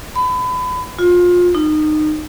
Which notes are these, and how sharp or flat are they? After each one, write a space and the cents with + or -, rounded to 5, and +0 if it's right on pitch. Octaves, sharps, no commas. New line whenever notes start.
B5 +30
F4 +25
D#4 -25